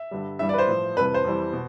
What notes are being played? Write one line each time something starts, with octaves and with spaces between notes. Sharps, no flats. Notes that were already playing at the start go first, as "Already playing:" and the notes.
Already playing: E5
G2 D3 G3
G2 E3 G3 E5
D5
B4
C5
A2 F3
F2 C3 E3 G3 B4
C5
F2 E3 G3
B2